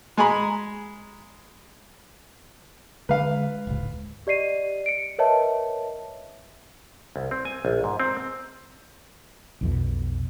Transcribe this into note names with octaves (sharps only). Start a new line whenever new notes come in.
G#3 G#5 A#5 B5
D3 G#3 B4 F5
D1 C#2 G#2
G4 D5 D#5 C7 D#7
C#7 D7
A#4 B4 C#5 D#5 E5 A5
C2
C4
G#5
A#1
G#2
C4
B1 F2 B2